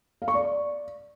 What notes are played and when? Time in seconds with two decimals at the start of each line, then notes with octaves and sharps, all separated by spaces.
0.22 F5
0.28 C#6
0.34 D5